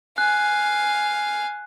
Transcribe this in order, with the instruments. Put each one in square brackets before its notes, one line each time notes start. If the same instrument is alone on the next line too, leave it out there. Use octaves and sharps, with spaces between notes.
[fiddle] F5 G#5 [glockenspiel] F#6